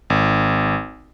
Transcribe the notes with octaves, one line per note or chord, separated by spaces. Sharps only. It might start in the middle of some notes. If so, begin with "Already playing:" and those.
G#1